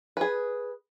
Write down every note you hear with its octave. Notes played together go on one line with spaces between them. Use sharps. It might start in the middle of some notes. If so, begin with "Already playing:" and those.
G#4 B4